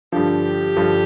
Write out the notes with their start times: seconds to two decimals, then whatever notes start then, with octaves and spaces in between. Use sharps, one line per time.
0.12 G2 D3 F3 G4
0.76 G2 D3 F3